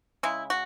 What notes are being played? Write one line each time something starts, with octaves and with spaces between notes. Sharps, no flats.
C#3 G#3 E4
F#4